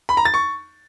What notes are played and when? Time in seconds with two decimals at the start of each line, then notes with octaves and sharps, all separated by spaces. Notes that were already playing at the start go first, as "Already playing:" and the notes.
0.09 B5
0.17 A#5
0.25 A6
0.34 C#6